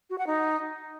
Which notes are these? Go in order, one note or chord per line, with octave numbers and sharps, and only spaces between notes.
F#4
F#5
D#4